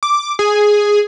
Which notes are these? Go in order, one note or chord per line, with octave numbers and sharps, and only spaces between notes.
D6
G#4